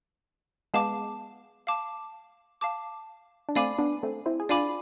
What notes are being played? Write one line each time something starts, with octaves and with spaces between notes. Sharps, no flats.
G#3 B3 F5 A5 D6
F5 A5 D6
F5 A5 D6
D4
A3 C4 D5 F5 G#5 B5 D6
B3 D4
A3 C4
C4 E4
G#4
D4 F4 D5 F5 G#5 B5 D6